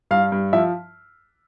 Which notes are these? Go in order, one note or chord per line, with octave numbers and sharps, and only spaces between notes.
G2 F5
G2
F3 E5